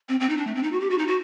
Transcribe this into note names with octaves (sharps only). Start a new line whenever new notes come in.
C4
C4
D#4
D4
A3
C4
D#4
F#4
G4
F#4
D#4
F#4